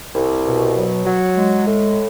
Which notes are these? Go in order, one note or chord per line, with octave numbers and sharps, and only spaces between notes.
C2
B2
F#3
F#3
G#3
A2